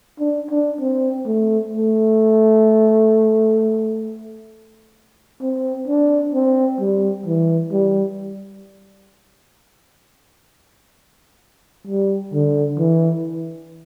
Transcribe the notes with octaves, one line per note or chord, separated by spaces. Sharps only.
D4
D4
C4
A3
A3
C4
D4
C4
G3
E3
G3
G3
D3
E3